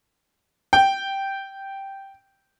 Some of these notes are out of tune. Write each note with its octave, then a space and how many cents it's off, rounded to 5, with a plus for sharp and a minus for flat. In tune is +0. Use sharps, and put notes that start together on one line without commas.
G5 -5